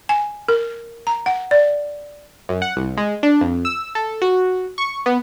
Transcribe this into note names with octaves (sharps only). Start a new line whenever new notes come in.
G#5
A#4
A#5
F#5
D5
F#2
F#5
C2
G#3
D4
F2
E6
A4
F#4
C#6
B3